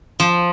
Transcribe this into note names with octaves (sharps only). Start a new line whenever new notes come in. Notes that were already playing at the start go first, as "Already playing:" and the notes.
F3